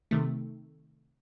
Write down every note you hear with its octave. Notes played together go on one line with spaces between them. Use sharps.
C3 D#3 A3